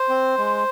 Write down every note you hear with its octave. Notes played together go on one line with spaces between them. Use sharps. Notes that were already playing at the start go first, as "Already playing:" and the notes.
Already playing: C5
C4
G#3